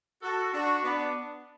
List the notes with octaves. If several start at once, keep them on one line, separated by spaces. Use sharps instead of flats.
F#4 A4
D4 F#4
B3 D4